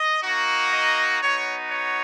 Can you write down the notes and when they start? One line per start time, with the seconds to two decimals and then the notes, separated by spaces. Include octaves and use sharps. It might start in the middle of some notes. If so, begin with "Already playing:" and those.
Already playing: D#5
0.23 A#3 D#4 F#4
0.72 D#5
1.20 B3 D#4 F#4 C#5
1.70 C#5